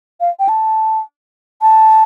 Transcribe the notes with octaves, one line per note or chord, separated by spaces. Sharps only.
F5
G5
A5
A5